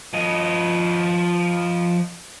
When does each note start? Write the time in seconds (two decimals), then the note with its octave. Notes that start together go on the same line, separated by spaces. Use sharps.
0.14 F3 D#5